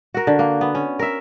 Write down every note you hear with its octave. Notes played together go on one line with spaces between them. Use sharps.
F#4 A#4
D3
A#3
B3
C#4
A#4 E5